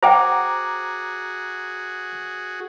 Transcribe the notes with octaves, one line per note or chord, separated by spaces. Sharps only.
F#4 G#4 C5 F#5 G5 A#5 D6